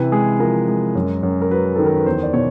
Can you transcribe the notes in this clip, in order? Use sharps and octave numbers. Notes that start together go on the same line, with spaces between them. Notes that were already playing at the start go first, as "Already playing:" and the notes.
Already playing: C3 E3 B4
G#3 G#4
F3 A#4
G#3
F#2
F#2
A#4
F#3 B4
D#3 A4
A#4
B4
E2 C5
D5
B2 C#5